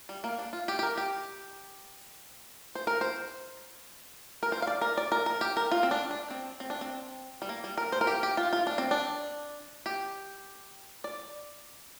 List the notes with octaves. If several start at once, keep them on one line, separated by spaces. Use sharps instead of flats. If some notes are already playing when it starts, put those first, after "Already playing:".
G3
A#3
D4
F4
G4
G4
A#4
G4
C5
A#4
C5
A#4
C5
F5
D5
A#4
D5
A#4
A#4
G4
A#4
F4
C4
D4
D4
C4
C4
D4
C4
G3
A#3
G3
A#4
C5
A#4
G4
G4
F4
F4
D4
C4
D4
G4
D5